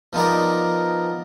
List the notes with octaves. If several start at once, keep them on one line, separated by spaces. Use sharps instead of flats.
F3 B3 D#4 A#4 D5